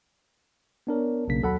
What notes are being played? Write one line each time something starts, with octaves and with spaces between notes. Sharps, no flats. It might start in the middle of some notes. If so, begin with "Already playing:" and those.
B3 D4 A#4 C#5
B1 C#3 A#3 B6
D#2 F#3 A4 F#5 B5